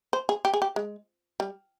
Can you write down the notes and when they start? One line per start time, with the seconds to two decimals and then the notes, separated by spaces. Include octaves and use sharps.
0.13 C5
0.29 G#4
0.45 G4
0.54 G#4
0.62 G4
0.76 G#3
1.40 G3